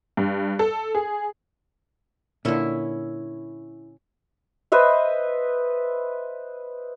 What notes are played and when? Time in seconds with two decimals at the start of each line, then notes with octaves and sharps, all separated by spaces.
0.17 G2
0.59 A4
0.95 G#4
2.45 A#2 D3 C#4 E4
4.72 B4 C5 D#5 E5